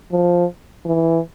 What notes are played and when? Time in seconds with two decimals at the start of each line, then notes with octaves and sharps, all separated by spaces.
0.11 F3
0.85 E3